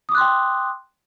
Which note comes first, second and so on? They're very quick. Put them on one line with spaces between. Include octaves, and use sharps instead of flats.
D#6 D6 F#6 C6 G5